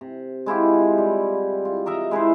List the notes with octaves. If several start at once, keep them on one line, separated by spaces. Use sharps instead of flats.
C3
G#3 E4 F4 G4
G3
F4
A#4 D#5 E5 A#5
G#3 E4 B4 C5